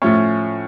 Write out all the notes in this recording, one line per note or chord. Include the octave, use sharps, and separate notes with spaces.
A2 F3 A3 C#4